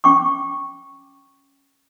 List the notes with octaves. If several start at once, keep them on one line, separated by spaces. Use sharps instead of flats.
C#4 G5 C#6 D6